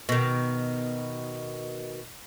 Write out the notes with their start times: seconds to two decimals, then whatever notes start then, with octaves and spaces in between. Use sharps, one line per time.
0.09 B2 D#3